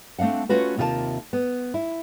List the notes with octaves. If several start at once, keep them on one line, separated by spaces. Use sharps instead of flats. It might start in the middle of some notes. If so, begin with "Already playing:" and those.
A3 C4 D4 F5 F#5
A3 C#4 F4 F#4 B4
D#2 C3 F4 G4 A#4 A5
B3
E4